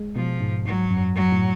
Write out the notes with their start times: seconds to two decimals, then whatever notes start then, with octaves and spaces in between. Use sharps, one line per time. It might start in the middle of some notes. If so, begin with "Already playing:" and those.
Already playing: G#3
0.16 B2 F3
0.41 G#2
0.65 G#2 F#3
0.90 F#2
1.16 F#3
1.32 A2